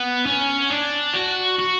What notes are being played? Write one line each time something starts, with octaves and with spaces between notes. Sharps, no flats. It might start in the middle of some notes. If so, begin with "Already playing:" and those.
Already playing: B3
C#4
D4
F#4
F#4